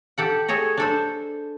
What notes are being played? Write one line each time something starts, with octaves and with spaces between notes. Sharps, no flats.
G4 A4 F#5
G#4 A4 C#5 D#5
D4 A4 C5